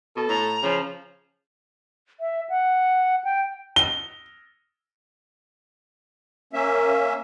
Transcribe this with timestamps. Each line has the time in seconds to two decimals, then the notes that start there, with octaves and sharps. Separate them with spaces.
0.17 B2 A4
0.29 A2 A#5
0.63 C#3 F3
2.20 E5
2.49 F#5
3.24 G5
3.76 G7
6.53 A#3 C#4 E5